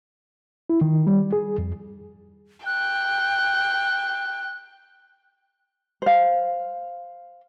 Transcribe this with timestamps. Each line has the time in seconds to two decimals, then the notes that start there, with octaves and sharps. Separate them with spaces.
0.70 E4
0.81 D#3
1.07 G3
1.33 G#4
1.58 F2
2.66 G5 F#6
6.02 C5 F5